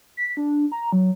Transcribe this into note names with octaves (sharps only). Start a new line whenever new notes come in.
B6
D4
A#5
F#3